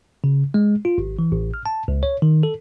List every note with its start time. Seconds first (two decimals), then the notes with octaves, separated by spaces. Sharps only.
0.24 C#3
0.54 G#3
0.85 F4
0.98 G#1
1.19 E3
1.32 A1
1.54 F6
1.66 A5
1.88 C#2
2.03 C#5
2.22 D#3
2.43 A4